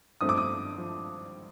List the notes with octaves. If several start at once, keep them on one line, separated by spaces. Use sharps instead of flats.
G2 F3 A3 C4 D#6
D6
D#6
F3